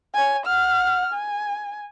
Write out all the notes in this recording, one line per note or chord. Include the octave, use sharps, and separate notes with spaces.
C#5 G#5
F#5 F6
G#5